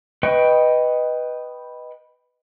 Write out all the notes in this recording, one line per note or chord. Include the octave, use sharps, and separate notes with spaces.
B4 D#5 G5 C#6